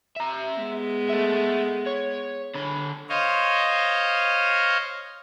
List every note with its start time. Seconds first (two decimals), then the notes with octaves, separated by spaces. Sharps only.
0.16 E5 A#5
0.58 G#3 B3
1.09 A4 E5
1.86 C#5
2.55 D3 B5
3.09 C5 C#5 D#5 F5